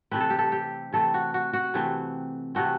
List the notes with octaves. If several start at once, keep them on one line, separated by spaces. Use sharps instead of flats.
C3 E3 A3 C4 B4
A4
G4
A4
G4
C3 E3 A3 C4 A4
F#4
F#4
F#4
C3 E3 A3 C4
C3 E3 A3 C4 F#4